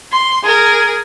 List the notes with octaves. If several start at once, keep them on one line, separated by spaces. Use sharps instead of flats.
C6
G#4 A#4